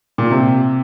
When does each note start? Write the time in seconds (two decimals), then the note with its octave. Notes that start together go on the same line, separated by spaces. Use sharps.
0.18 A#2
0.31 C3